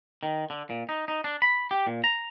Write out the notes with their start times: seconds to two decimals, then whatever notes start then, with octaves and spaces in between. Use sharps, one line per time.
0.23 D#3
0.50 D3
0.70 A#2
0.89 D#4
1.08 D#4
1.24 D4
1.42 B5
1.71 G4
1.87 A#2
2.04 A#5